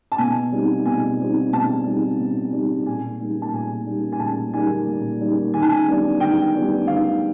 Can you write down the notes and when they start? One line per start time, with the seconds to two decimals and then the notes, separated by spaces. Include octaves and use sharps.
0.12 A5
0.18 B2 G#5
0.52 G3 C4 D#4
0.85 B2 G#5
1.19 G3 C4 D#4
1.53 B2 A5
1.86 G3 C4 D#4
2.19 B2
2.53 G3 C4 D#4
2.86 A#2 G#5
3.20 G3 A#3 D#4
3.42 A5
3.53 A#2 G#5
3.86 G3 A#3 D#4
4.12 G#5
4.20 A#2 A5
4.53 G3 A#3 D#4 G#5
4.88 A#2
5.21 G3 A#3 D#4
5.54 D#3 G#5
5.62 A5
5.71 G#5
5.88 G3 B3 D4
6.20 D#3 G5
6.54 G3 B3 D4
6.87 D#3 F5